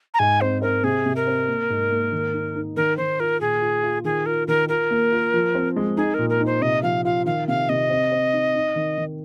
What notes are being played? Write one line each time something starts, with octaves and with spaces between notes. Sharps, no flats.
A#5
G#2 G#5
C4 C5
C4 A#4
C3 G#4
C3
A#4
C4
A#3
G#2
A#3
D#3
D#4
D#4
D#3 A#4
D#3 C5
F4 A#4
A#2 G#4
F4
F4
D#3 G#4
F4 A#4
D#3 A#4
F4 A#4
A#3
F4
F3
C4
G#3
D#4 G#4
A#2 A#4
A#4
D#4
C5
C3 D#5
F3 F5
F4 F5
D#3 F5
C3 F5
C3 D#5
C4
C4
D#4
D#4
D#3
D#3